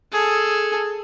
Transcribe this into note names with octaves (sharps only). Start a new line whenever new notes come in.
G#4 A4